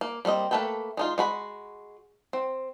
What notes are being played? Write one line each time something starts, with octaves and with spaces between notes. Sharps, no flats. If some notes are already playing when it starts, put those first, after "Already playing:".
A#3
G3 A#3 C4 D#5
A3 A#3 A4 B4 G5
G#3 D#4 F4
G#3 F#4 B5
C4